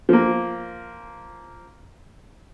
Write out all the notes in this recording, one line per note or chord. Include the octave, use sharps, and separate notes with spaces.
F3 A#3